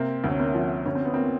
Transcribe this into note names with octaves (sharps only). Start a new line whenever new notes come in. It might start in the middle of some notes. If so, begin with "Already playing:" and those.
Already playing: C3 A#3 C4
D2 C#4
A#3 C4
F3
D2 C#4
C4
B3
A#3 C4